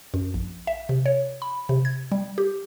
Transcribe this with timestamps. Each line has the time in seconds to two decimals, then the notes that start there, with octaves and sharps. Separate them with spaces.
0.14 F#2
0.34 A#1
0.67 E5
0.89 C3
1.06 C#5
1.42 B5
1.69 C3
1.85 G#6
2.12 G3
2.38 G4